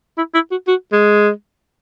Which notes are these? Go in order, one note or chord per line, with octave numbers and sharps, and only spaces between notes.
E4
E4
F#4
F#4
G#3